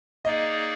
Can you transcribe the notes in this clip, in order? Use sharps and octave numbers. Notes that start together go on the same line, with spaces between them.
A#3 D#4 G#4 D5 D#5